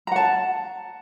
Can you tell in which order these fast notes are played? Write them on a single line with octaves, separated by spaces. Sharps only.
A#5 F#5 A5